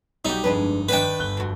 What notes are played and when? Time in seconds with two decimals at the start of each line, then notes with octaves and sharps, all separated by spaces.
0.25 B1 G3 D#4 F#4 G4
0.44 G1 F2 G#3 D4 B4
0.89 D#3 D4 D#4 B4 G5
1.19 G1 F#6 G7
1.37 F2 F#4